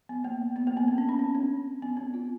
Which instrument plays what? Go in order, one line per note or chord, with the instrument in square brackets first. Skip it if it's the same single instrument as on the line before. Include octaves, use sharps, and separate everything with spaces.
[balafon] B3
A#3
B3
A#3
B3
C4
C#4
D4
C#4
C4
B3
C4
F4